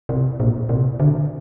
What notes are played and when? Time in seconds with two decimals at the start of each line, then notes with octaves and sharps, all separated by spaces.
0.09 C3
0.40 A#2
0.69 C3
1.00 D3